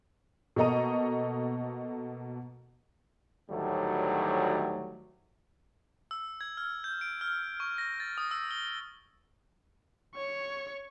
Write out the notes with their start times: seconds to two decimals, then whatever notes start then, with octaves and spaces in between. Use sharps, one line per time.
0.56 B2 A#3 A4 D#5 A#5 D#7
3.50 D2 A2 D#3 F#3 G3 A3
6.11 E6
6.41 G#6
6.57 F6
6.84 G6
7.01 D7
7.21 F6
7.60 C#6
7.78 A#6
8.00 A6
8.18 D#6
8.31 E6
8.51 G7
10.15 C#5 C#6